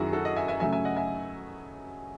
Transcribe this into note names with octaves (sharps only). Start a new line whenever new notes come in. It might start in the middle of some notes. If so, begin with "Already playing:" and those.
Already playing: F#2 D#3 F#3 E4 F#4 G#4
F#4 A4
D#5 F#5
E5 G#5
E5 G#5
C#3 F#3 A3 E5 G#5
E5 G#5
D#5 F#5
E5 G#5